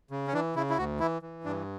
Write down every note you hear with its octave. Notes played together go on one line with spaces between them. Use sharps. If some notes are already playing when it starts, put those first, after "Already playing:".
C#3
C#4
E3 D4
C#3 E4
E4
D2 F#4
E3 E4
E3
G2 D4